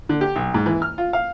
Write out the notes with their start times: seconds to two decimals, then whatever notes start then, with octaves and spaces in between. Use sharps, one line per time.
0.09 D3
0.21 G4
0.36 B1
0.54 G#2
0.66 E3
0.82 F6
0.98 F4
1.13 F5